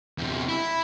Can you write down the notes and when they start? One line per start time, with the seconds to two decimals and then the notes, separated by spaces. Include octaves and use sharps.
0.18 E2 C3
0.49 E4